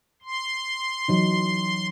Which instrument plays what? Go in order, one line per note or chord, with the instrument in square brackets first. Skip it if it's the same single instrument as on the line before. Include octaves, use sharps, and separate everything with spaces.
[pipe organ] C6
[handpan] E3 F#3 D#4